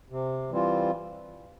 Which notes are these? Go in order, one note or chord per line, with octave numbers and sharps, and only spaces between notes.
C3
E3 G3 C4 F4